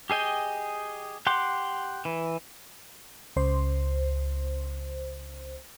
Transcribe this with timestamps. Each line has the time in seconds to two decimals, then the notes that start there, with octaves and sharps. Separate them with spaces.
0.10 G4 G#4 D#5 G5
1.27 G4 F#5 G5 C6 D6
2.05 E3
3.36 C#2 C5